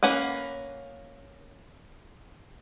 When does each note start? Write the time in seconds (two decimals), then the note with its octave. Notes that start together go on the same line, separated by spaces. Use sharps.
0.03 A#3 C#4 B4 F#5